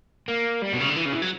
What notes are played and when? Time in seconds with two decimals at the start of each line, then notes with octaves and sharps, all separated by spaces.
0.28 A#3
0.62 G3
0.73 B2
0.81 C#3
0.89 D3
0.97 E3
1.05 C#3
1.13 E3
1.22 F#3